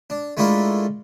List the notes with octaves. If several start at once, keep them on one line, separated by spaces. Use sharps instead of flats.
D4
G#3 A3 D4 E4 F4 A#4